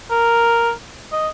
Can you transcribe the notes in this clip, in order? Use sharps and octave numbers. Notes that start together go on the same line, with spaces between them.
A#4
D#5